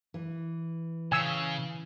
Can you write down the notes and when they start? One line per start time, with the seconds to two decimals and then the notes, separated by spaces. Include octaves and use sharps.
0.14 E3
1.12 C#3 G#5 E6